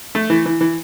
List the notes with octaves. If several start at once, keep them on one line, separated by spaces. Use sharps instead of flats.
A3
E3
E3
E3